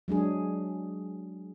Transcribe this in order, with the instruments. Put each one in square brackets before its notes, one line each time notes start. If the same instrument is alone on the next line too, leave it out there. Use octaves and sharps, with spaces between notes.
[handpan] F#3 G#3 D4 G#4